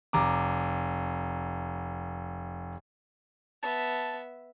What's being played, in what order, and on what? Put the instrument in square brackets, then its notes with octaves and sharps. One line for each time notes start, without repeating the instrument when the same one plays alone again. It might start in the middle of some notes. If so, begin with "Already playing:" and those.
[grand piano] F1 A#5 D6
[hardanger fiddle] B3 E5 [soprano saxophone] A5